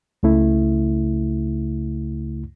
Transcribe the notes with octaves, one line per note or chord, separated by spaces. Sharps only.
C#2 C#3 A3 E4